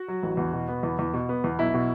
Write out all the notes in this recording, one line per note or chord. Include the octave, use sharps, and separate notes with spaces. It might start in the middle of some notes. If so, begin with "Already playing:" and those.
Already playing: F#4
F#3
A1
E2
B2
B3
E2
E2
B2
B3
E2
B1 E4
B2